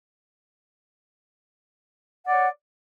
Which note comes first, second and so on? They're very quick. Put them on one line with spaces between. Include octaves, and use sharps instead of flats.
F#5 D5 C#5